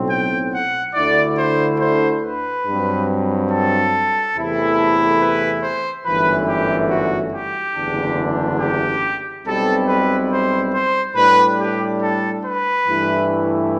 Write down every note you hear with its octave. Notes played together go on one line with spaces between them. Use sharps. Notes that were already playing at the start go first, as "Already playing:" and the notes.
Already playing: B1 A2 F#3 C4
G5
F#5
D2 D3 A3 E4 D5
C5
C5
B4
G2 F#3 C4
A4
E2 C3 E3 A3 E4
A4
B4
C5
G1 F#2 E3 A3 B4
G4
F#4
G4
F#1 E2 D3 A3 D4
G4
B1 B2 G3 C4 E4 A4
B4
C5
C5
A2 G3 D4 B4
G4
A4
B4
G2 E3 A3 E4